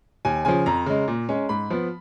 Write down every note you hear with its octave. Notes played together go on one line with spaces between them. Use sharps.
D#2 G#5
C#3 F3 G#5
F2 A#5
C#3 G#3
A#2
G#3 C#4
G#2 B5
F3 B3